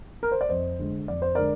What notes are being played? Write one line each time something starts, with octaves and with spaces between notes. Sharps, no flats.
A#4
C5
D5
F2 C5 D#5
D3 G#3
F2 D5
C5
D3 G#3 A#4 D5